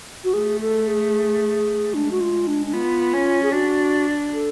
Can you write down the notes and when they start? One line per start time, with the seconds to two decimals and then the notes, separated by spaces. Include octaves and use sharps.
0.24 F#4
0.33 A3 G#4
0.61 A4
0.87 G#4
1.93 G#3 D4
2.11 F#4
2.21 F4
2.47 D4
2.67 D4
2.73 B3 F4
3.14 C#4
3.43 G#4
3.53 D4 F#4
4.33 A4